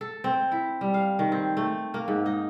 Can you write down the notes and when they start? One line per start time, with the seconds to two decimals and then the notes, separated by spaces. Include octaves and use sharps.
0.01 A4
0.24 C4
0.52 E4
0.81 G3
0.94 F5
1.19 D#3
1.32 C4
1.57 A3
1.94 A#3
2.08 G#2
2.26 D#4